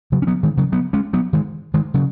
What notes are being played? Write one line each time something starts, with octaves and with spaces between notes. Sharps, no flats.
C#3 F#3
C#4
F#3 B3
D#3 G#3
C#3 F#3
F#3 B3
G#3 C#4
F#3 B3
D#3 G#3
D#3 G#3
C#3 F#3